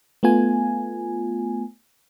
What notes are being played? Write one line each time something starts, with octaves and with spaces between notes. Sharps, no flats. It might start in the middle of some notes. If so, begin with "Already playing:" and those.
A3 B3 F4 G#5